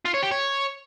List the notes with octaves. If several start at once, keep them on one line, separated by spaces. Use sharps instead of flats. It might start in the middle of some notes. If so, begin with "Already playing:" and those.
F4
C#5
G4
C#5